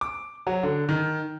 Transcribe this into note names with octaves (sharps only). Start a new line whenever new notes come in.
D6
F#3
D3
D#3